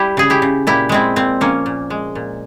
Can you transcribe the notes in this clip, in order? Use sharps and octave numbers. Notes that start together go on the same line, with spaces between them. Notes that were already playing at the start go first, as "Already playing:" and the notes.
Already playing: G3 E4 G4
C#3 G#4
E4 G4
C#3
A#2 E4 G4
G#3 C4 E4
A#2 C4
F3 A#3 C#4
A#2
G#3
A#2